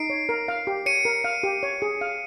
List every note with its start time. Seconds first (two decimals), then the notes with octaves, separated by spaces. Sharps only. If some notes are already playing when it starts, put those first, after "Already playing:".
Already playing: D#4 C7 D7
0.10 C#5
0.29 A#4
0.48 F5
0.67 G4
0.86 C#5 C#7 D#7
1.05 A#4
1.24 F5
1.43 G4
1.63 C#5
1.82 G#4
2.01 F5